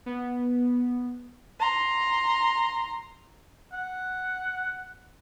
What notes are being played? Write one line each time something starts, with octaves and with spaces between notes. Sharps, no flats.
B3
A#5 C6
F#5